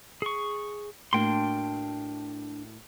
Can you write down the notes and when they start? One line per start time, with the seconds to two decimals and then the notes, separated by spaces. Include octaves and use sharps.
0.22 G#4 C#6
1.13 A2 A#3 D4 F#4 G5 C6